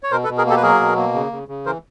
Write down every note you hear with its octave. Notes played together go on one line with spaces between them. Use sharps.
C#5
B2 A#4 C5
A4 B4
B2
G#4 A#4
A#3 G4 A4
B4
F#3 G#4 A#4
B2
A#3
C#3
C#3
C#3
E3 A#4 C5